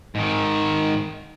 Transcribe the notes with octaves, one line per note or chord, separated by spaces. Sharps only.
G#2 D#3